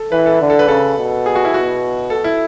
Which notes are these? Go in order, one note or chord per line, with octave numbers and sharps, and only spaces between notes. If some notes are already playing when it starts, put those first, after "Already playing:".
Already playing: A4
E3 B4
A4
D3
A4
B4
C#3 A4
B2
G#4
F#4
E4
B2 F#4
A4
E4